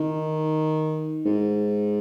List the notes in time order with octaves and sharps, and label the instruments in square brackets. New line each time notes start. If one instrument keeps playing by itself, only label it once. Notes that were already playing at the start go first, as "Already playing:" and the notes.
Already playing: [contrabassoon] D#3
G#2